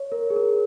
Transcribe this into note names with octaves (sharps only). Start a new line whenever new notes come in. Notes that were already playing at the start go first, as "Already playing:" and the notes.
Already playing: C#5
A#4
G#4
A#4